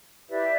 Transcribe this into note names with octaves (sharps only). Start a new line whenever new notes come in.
E4 G4 B4 D5 E5